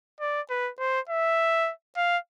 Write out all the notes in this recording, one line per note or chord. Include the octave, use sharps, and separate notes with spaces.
D5
B4
C5
E5
F5